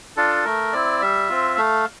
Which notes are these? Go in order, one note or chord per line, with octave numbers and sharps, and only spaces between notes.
D4 F4 A4
A3 A#4
C4 E4 D5
G3 E5
C4 F4
A3 F5